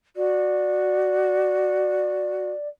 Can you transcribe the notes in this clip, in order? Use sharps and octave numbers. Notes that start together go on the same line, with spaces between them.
F#4 D5